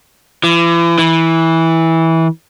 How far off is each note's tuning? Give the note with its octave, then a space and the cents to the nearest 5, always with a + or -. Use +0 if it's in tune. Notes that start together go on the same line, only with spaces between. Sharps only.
E3 +40
E3 -15